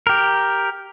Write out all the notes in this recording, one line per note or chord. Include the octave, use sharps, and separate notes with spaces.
G4 A#4